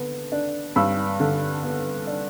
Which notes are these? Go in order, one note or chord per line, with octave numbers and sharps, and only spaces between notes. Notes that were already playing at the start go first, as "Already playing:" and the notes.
Already playing: D3 B3
D4
G2 B5 E6
D3
B3
D4